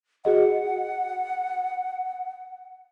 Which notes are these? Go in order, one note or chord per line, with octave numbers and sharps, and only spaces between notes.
F#4 G#4 D#5 F#5